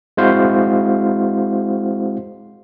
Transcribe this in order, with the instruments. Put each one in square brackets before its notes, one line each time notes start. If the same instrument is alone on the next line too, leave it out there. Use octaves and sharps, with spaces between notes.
[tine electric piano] G#3 C4 E4 F#4 C5 F5